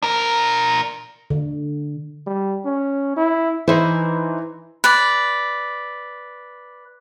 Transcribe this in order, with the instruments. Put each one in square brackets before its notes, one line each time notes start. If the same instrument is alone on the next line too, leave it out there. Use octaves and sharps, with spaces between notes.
[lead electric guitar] D4 A#4
[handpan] D3
[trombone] G3
C#4
E4
[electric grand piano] E3 [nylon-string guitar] D#4 E4 C5
[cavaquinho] B4 D5